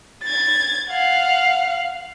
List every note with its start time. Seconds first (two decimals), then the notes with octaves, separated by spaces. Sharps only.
0.23 G#6 A6
0.89 F5 F#5